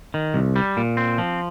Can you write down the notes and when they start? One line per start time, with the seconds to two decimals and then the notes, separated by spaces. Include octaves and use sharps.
0.14 D#3
0.34 C2
0.56 G3
0.77 A#2
0.97 C4
1.18 F3